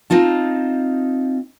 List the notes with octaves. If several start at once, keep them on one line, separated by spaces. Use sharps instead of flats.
C4 D#4 F4 A5